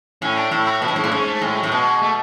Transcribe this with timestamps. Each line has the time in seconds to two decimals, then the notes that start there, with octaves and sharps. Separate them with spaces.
0.22 A2 C#4
0.36 D4
0.51 A2 E4
0.67 F#4
0.82 B2 E4
0.88 A2
0.96 G#2 E4
1.04 A2
1.12 G#2 C#4
1.27 A3
1.41 A2 G#3
1.56 F#3
1.63 A2
1.67 A3
1.71 B2 G#3
2.02 A3